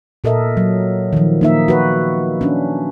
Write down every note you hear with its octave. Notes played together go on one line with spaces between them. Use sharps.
A#2 A4 A#4 D#5 E5
F#3
D#3 F3
A#3 D#4 E5
F#4 B4
C#4 D4